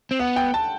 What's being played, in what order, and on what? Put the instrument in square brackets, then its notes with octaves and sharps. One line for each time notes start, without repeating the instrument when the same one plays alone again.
[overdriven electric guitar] C4
[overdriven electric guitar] B3 [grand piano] F#5
[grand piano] G5
A5